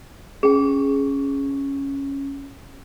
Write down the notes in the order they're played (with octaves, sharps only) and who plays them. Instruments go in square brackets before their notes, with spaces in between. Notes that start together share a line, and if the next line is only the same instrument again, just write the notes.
[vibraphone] C#4 [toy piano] G#4 G5